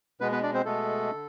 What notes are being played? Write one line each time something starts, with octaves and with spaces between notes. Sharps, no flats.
B2 G#3 B3 B4
B3 B4
D4 D5
C4 C5
B2 G#3 A3 B3 A4
D3